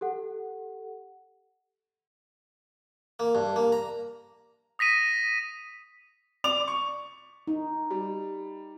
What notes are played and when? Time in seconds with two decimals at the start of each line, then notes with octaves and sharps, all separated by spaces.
0.01 G4 A4 F#5
3.20 A#3
3.35 G2
3.56 A#3
3.72 A#5
4.79 D#6 A#6 B6 D#7
6.44 D5 D6 F7
6.68 C#6
7.47 D#4
7.91 G3